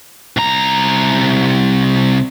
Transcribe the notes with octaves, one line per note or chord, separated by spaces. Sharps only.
C2 A#5